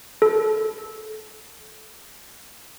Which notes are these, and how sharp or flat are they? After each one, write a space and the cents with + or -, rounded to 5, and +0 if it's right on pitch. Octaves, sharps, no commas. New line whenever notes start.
A4 -25